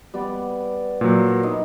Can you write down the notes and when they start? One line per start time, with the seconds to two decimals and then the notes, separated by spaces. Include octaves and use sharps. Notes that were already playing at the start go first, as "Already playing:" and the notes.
0.14 G3 B3 D5
1.01 A#2 F#3
1.29 A#4
1.43 D#4 E4 C6